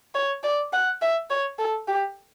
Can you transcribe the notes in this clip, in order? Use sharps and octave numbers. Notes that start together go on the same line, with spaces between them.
C#5
D5
F#5
E5
C#5
A4
G4